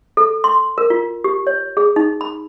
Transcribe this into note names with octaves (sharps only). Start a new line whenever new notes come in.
A4
C6
A#4
F4
G4
C#5
G#4
D#4
B5